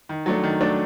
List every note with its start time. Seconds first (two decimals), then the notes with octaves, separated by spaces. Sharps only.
0.09 D#3
0.26 F#3 A3 D4
0.43 D#3
0.61 F#3 A3 D4